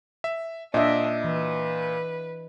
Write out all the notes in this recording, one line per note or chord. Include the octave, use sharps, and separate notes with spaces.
E5
A#2 D4 D#5 E5
E3 B4